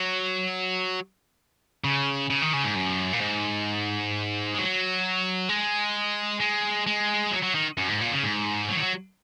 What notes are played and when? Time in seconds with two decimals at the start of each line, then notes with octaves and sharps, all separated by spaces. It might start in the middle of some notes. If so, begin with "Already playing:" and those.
Already playing: F#3
1.84 C#3
2.30 C#3
2.42 D#3
2.53 C#3
2.64 G#2
2.76 F#2
3.13 A#2
3.21 G#2
4.54 G#3
4.58 F#3
5.49 G#3
6.41 G#3
6.87 G#3
7.32 F#3
7.43 F#3
7.55 D#3
7.77 F#2
7.89 G#2
8.01 A#2
8.12 C#3
8.23 G#2
8.69 F#3
8.75 D#3
8.80 F#3